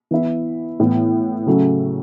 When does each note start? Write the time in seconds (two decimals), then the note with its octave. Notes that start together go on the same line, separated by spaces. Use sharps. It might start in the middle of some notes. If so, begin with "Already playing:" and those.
0.11 E3 B3 E4
0.80 A2 E3 B3
1.47 C#3 F#3 A3 C#4